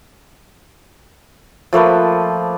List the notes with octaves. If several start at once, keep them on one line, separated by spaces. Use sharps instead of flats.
F3 A3 A#3 B4